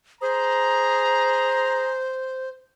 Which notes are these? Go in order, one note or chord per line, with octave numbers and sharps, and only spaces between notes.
G#4 C5 A#5